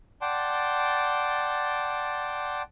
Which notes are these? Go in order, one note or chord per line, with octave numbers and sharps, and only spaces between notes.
D5 F#5 G5 A5 C6